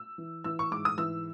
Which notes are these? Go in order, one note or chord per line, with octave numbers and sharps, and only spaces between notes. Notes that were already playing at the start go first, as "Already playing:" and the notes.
Already playing: E6
E3
E3 E6
C#6
G#2 D6
D#6
E3 E6